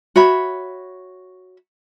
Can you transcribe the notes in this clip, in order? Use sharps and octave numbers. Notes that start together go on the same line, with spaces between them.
F#4 C#5 E5 B5